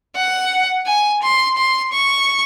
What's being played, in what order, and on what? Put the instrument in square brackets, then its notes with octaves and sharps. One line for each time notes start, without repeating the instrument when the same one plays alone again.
[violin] F#5
G#5
C6
C6
C#6